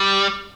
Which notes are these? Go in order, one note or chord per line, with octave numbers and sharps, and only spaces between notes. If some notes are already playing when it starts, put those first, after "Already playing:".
Already playing: G3